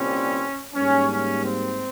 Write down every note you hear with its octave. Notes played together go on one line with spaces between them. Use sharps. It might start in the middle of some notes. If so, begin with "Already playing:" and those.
Already playing: C2 A#2 G3 C4 C#4
G#2 G3 A#3 C#4
C#4
C4